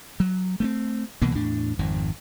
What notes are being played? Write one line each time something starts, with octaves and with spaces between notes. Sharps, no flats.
F#3
A3 A#3 C4
C2 B2 E3 A#3
E2 A2 D4
G#1 F2 D#3